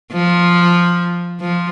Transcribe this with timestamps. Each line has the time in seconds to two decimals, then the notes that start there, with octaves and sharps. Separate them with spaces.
0.12 F3
1.41 F3